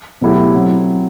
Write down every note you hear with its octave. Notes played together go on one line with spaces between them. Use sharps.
B2 F#3 A3 E4 G4
F#3 C4